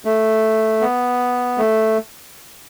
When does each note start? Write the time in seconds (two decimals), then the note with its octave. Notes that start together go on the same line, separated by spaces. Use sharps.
0.05 A3
0.81 B3
1.58 A3